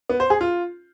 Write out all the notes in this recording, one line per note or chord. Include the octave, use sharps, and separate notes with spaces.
B3
C5
G#4
F4